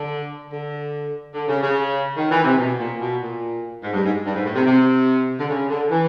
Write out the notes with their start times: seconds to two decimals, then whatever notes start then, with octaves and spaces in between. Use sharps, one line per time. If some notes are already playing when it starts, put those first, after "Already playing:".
Already playing: D3
0.51 D3
1.34 D3
1.48 C#3
1.62 C#3
2.17 D#3
2.31 E3
2.44 C3
2.59 B2
2.79 A#2
3.00 B2
3.21 A#2
3.83 G#2
3.93 G2
4.04 G#2
4.25 G2
4.35 G#2
4.45 A2
4.55 C3
4.66 C3
5.39 D3
5.49 C#3
5.69 D3
5.90 E3